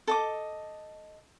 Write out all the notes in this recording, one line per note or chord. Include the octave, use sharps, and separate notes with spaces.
A4 D#5 D6